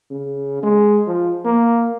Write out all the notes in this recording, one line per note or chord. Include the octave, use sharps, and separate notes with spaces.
C#3
G#3
F3
A#3